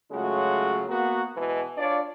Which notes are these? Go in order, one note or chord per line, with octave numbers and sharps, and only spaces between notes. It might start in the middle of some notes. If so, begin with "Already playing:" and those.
C#3 F#3 G#3 A3 F4 F#4
A#3 B3 F#4
B2 E3 G#3
D4 F4 C#5 D5